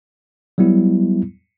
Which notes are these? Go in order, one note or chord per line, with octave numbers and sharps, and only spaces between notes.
F#3 G3 B3 E4